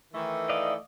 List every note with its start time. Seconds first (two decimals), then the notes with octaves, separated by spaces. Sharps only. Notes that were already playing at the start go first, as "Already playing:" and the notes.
0.13 D#3 E3 A3
0.49 D5 D#5 F5